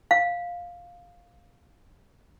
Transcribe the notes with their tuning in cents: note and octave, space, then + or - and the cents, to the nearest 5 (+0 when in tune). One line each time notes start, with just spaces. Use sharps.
F5 +5